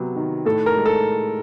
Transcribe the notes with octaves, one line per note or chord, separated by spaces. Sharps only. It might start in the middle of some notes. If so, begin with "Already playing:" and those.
Already playing: C3 F#3 B3
D#3
A2 A4
A#4
G#3
A4